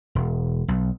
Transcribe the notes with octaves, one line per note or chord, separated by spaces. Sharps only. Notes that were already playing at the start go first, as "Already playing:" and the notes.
E1
B1